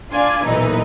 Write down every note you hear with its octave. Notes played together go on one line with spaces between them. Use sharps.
D4 F4 D5 G#5
B1 A#2 E3 D#4